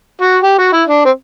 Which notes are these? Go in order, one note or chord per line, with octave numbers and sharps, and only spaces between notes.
F#4
G4
F#4
E4
D4
C4